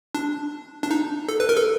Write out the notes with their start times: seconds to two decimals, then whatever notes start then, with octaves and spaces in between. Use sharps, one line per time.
0.15 D4
0.83 D4
0.91 D#4
1.28 A4
1.40 B4
1.49 A#4
1.57 A4